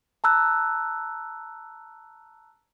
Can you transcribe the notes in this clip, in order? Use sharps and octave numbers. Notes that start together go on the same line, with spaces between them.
A5 A#5 E6 F#6